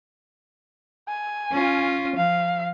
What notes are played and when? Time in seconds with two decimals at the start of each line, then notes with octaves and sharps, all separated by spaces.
1.08 G#5
1.52 C#4 F4
2.17 F3 F5